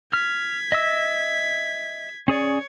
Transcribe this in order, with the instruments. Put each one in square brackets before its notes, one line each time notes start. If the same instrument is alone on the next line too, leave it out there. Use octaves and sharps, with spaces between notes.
[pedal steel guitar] F6 [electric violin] G#6 B6
[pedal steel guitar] D#5 E5 E6
[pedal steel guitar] C#4 G#4 D5 [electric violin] C#5